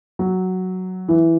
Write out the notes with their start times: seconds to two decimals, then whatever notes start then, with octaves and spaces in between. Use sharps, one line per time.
0.19 F#3
1.08 E3